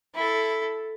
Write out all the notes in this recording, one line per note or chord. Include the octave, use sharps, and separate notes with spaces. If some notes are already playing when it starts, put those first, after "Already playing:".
E4 A4